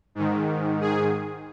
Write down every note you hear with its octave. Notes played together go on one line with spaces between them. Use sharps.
G#2 D#3
G#4